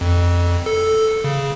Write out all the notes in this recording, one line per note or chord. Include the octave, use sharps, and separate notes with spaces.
F2
A4
C#3